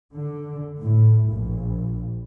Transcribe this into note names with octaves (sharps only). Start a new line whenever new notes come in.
D3
A2
A#1